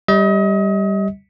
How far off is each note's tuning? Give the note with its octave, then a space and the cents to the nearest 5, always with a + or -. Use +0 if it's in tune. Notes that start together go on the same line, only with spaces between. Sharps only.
G3 +0 D#5 +35